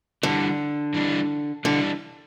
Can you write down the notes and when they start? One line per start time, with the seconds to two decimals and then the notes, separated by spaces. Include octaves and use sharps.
0.23 D3 E3 G3 D4
0.94 E3 G3 D4
1.64 D3 E3 G3 D4